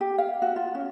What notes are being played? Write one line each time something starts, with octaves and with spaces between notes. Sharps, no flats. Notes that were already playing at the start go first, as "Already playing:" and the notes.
G4
F5
F#4
F4
C#4